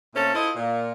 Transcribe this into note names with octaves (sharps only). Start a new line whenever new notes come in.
A#2 A3 C4 C#4 A4
E4 F4 A4 C5 D#5
A#2